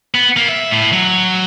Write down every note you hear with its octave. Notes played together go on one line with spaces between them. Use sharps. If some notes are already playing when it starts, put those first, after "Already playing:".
B3
A#3
E5
A2
F#3